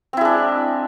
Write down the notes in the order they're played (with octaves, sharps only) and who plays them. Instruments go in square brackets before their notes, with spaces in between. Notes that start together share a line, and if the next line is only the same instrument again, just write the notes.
[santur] C4
E4
G#3
D4